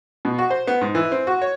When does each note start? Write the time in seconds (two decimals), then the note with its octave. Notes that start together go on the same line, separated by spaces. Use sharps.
0.25 B2
0.38 F#4
0.50 C5
0.67 B3
0.81 G#2
0.95 E3
1.12 C4
1.27 F#4
1.42 C#5